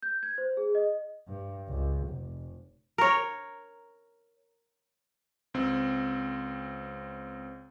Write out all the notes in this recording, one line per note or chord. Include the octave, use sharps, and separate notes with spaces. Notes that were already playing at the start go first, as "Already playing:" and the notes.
G6
G#6
C5
G#4
D#5
G2
C#2
F1
A#4 C#5
C#2 C4